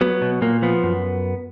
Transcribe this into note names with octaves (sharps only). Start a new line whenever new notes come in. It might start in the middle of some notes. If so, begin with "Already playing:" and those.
F#3 B3
B2
A#2 A#3
F3 B3
F#2